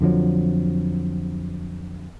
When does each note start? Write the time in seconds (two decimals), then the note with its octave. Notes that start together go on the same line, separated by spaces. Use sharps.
0.01 F2 D3 F3 F#3